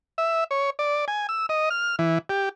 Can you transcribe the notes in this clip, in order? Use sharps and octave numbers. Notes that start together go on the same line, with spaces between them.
E5
C#5
D5
G#5
E6
D#5
F6
E3
G4